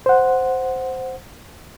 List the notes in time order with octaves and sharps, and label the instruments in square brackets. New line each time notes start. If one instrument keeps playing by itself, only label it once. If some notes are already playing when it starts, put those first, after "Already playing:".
[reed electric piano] C5 F#5